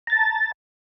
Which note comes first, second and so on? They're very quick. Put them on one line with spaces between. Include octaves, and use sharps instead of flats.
A#5 A6 A5